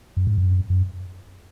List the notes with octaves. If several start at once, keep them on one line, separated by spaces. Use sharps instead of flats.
F#2
G#2
F#2
F#2